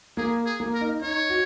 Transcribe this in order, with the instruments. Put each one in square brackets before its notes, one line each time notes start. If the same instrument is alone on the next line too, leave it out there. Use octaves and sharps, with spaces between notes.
[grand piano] A#3 [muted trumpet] G#4
[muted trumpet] G#4
[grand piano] A#3
[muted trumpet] A#4
[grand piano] D#4
[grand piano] D#4 [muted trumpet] C#5
[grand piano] F#4